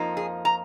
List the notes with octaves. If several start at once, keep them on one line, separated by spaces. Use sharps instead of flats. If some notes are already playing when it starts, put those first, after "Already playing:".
Already playing: F2 F3 A#3 D#4
G#4
A#5